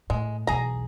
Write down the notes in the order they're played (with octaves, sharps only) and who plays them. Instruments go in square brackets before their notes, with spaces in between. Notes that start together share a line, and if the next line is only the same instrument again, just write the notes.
[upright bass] A2 [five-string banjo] G#3
[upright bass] B1 E2 [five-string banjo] G#4 A#5